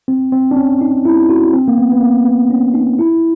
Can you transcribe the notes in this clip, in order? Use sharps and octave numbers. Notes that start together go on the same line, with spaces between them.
C4
C4
D4
C#4
D#4
E4
F#4
C4
A#3
B3
B3
A#3
B3
C#4
D#4
E4